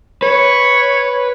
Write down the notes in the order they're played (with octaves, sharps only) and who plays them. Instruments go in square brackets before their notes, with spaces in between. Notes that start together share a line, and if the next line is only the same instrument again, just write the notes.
[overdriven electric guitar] B4 [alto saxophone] C#5